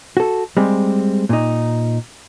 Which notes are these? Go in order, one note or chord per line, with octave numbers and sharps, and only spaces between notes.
F#4 A4
G3 G#3 C4
A#2 D#4